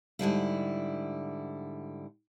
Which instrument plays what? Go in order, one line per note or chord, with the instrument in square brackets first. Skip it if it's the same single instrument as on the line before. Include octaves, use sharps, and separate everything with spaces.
[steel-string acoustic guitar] G#2 D3 G3 E4